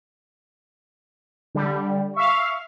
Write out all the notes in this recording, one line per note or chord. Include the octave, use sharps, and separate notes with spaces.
D3 G3
E5 F5 C#6